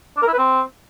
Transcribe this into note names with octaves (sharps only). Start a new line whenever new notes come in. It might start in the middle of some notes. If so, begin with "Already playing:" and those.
D4
A#4
E4
B4
C4